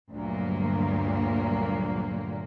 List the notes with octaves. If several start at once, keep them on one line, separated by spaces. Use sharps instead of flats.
D2 G2 A#2 F#3 A#3